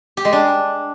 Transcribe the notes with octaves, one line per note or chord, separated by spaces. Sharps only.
G4
G#3
D4